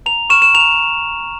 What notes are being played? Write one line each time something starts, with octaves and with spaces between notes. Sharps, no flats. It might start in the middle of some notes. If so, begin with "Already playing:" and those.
A#5 F7
C#6 F6 E7
E7
A#5 F7